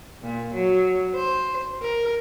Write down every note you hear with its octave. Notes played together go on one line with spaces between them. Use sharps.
A#2
F#3
C5
A#4